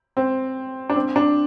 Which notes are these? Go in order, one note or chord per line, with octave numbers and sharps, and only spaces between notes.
C4
D4
C4
D4